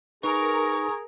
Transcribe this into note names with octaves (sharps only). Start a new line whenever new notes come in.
D#4 G#4 A#4 B4 C#6